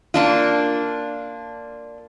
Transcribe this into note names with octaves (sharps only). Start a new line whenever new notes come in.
A#3 D4 F4